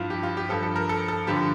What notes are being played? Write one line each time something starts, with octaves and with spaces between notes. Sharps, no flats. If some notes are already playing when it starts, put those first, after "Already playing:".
Already playing: G2 F3 E4 F4
G4
F4
G4
G2 F3 A4
A4
A#4
A4
A4
G2 D3 F3 G4